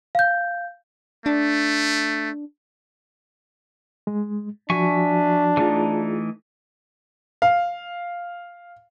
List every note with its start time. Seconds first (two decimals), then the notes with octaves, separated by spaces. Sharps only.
0.15 F5 G6
1.26 A3 D4
4.07 G#3
4.70 F3 D4 F#4 E5 G#5 C#6
5.57 E3 A3 D#4 F4 G#4
7.42 F5